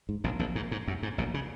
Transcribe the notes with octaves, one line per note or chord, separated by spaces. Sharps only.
G#2
A#1 A#2
A#1 A#2
G#2
G#2
F#2
G#2
A#1 A#2
C#3